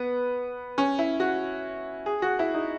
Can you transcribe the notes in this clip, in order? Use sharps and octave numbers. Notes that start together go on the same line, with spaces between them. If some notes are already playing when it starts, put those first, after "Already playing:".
Already playing: B3
C#4
E4
F#4
G#4
F#4
E4
D#4